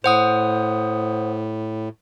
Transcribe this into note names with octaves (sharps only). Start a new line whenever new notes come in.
A2 C5 F#5 D#6